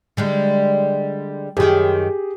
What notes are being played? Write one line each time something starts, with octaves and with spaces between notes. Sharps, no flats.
D3 G3 G#3
F#2 D#3 G4 G#4